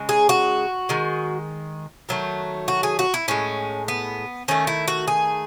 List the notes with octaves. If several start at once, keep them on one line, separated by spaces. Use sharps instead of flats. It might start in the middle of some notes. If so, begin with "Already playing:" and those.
Already playing: C#3 G#3
G#4
F#4
D#3 G#3
D#3 F#3 A3
F#4
G#4
F#4
E4
A2 G#3 C#4
B3
D#3 A3 C#4
E4
F#4
G#4